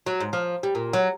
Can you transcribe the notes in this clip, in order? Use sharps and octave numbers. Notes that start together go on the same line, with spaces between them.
F#3
G#2
F3
G3
A#2
F#3